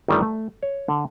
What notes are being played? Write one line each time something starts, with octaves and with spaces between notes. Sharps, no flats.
G1 D#3 G3 A3 D5 E5
A3
C#5
D3